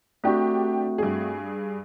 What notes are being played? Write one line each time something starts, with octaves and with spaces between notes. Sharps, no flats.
A3 C4 D4 F#4 G4
G2 G#4